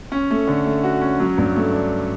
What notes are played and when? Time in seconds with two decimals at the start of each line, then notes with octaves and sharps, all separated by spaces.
0.12 C#4
0.31 A3
0.47 D3
0.66 A3
0.84 F#4
1.01 C#4
1.19 F#3
1.38 G2
1.56 A3
1.74 D4